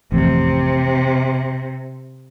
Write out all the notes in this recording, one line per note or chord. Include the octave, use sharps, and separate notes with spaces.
A1 F2 C3